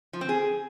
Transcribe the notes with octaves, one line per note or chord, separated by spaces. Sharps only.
F3
C4
G#4